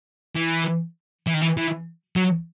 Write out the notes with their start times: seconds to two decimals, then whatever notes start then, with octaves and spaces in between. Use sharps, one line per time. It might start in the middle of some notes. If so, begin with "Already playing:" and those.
0.36 E3
1.27 E3
1.34 D#3
1.41 E3
1.57 E3
2.16 F#3